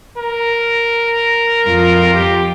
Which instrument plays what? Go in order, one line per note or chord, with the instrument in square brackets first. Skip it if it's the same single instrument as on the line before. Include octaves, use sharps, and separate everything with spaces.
[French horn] A#4
[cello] F2 F4
[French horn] G4